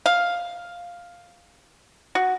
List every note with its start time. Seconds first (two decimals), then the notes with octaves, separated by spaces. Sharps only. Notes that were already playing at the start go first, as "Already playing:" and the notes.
0.06 F5
2.15 F#4